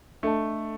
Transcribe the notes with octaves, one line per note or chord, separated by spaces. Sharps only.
A3 D4 A4 D#5 A5